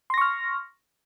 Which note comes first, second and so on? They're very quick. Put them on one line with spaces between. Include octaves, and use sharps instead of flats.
C6 A#6 C#6 F6